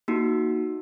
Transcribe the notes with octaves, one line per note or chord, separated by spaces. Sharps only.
A#3 D#4 F#4